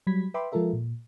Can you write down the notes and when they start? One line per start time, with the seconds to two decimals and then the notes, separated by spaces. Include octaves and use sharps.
0.07 F#3 G3 B5 G#6 B6
0.34 B4 E5 G5 B5 C6 D6
0.52 F3 G#3 F4 A4 A#4 E5
0.73 A#2